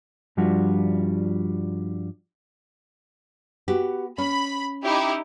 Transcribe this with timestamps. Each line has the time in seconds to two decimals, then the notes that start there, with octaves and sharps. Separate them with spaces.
0.37 G2 F3 G3 D4 F4 F#4
3.68 B3 F#4 G4
4.18 C#4 B5
4.83 D#4 E4 G4